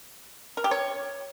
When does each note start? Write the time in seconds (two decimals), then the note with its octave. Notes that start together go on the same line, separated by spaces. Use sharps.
0.57 A#4
0.64 G4
0.71 C#5